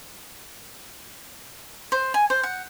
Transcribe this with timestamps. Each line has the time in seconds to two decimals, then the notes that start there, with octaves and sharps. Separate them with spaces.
1.92 C5
2.14 G#5
2.30 C5
2.43 F#5